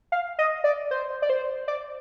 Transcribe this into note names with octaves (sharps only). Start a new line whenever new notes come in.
F5
D#5
D5
C5
D5
C5
D5